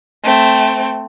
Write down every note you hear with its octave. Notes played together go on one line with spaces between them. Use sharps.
A3 C4